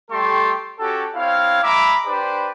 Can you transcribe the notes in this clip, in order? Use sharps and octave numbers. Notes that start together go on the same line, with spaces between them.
G3 A3 G4 A4 C6 C#6
C#4 F#4 G4 A4
C4 E4 C#5 F5
G#3 E5 A#5 B5 D6
D4 G4 B4 C5 D5 B5